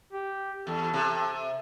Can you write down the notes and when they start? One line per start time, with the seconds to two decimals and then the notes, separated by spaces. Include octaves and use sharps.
0.13 G4
0.67 E2 A4
0.94 C3